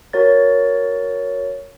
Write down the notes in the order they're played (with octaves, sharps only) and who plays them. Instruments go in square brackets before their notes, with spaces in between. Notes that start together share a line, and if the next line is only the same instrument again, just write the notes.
[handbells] F#4 A#4 C#5 A6